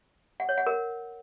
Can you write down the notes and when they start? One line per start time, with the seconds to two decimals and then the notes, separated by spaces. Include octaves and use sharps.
0.40 F#5
0.49 C#5
0.58 F#5
0.66 A#4